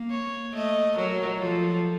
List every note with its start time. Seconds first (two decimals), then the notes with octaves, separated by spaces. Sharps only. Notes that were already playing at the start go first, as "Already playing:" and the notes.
Already playing: A#3
0.10 C#5
0.53 A3 D#5
0.96 F#3 A#4
1.39 F3 A4